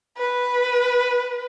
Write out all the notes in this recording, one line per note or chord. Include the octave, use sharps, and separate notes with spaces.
B4